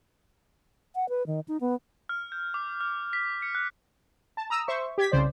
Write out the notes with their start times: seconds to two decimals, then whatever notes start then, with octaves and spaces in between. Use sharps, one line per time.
0.95 F#5
1.09 B4
1.27 D#3
1.48 D#4
1.61 B3
2.09 F6
2.32 G6
2.54 D6
2.81 F6
3.13 B6
3.42 C#7
3.55 F#6
4.37 A5
4.50 A#5 D#6 E6
4.68 C5 E5 C#6
4.98 G4 G#6 B6
5.12 C2 C#3 C5 D5